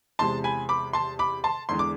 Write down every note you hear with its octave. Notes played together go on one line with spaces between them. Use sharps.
E2 C3 G#3 A5 C6
G#5 B5
B5 D6
A5 C6
B5 D6
A5 C6
E2 D3 G#3 C6
D6